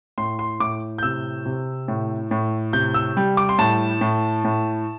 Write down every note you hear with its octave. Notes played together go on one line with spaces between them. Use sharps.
A2 C6
C6
A2 D6
G6
C3 E6
C3
A2
A2
C3 G6
E6
G3
D6
C6
A2 A5
A2
A2